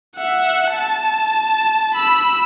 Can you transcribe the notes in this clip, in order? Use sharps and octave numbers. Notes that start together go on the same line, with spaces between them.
E5 F#5
A5
B5 E6